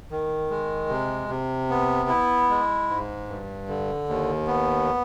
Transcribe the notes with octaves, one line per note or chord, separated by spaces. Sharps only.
D#3
G#3
C3
C3
B3
E4
G#3
G#2
G2
D3
D#2
B3